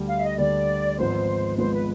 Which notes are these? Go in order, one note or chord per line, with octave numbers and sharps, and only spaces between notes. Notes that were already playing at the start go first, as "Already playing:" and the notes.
Already playing: D2 D3 G3
F5
E5
D#5
D2 D3 G3 D5
G#1 G#2 F3 G#3 B3 C5
G#1 G#2 F3 G#3 B3 C5
B4